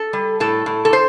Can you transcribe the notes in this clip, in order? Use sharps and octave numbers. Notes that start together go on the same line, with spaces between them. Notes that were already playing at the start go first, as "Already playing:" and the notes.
Already playing: A4
G3
A2 A4
A2
A4
C5